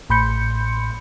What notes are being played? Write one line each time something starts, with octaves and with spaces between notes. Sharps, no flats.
A1 A2 B5 C6 G6 C#7